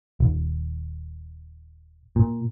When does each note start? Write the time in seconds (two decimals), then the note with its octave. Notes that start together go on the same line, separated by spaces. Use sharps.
0.20 D#1
2.16 A#2